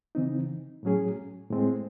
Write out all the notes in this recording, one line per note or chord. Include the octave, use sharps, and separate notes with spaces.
C#3 E3 C4 D#4
A2 F#3 C#4 G#4
A2 G#3 C4